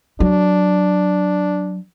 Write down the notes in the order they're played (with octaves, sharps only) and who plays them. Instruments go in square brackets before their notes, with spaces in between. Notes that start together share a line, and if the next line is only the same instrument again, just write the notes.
[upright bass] F#3 [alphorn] D4